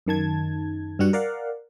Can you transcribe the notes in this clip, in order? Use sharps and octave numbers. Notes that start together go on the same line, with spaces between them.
F#2 D#3 A5 G#6
G2 G3 F#4 F#5
A#4 D5 F5 F#5